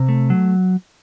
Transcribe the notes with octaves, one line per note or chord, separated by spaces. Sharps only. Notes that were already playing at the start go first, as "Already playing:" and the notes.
Already playing: C3
A3
F#3